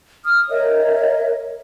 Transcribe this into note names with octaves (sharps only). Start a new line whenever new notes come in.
D#6 F6
A#4 C#5 D#5 E5